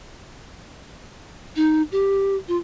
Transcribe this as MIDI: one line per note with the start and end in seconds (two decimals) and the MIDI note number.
1.56 1.82 63
1.92 2.36 67
2.48 2.57 65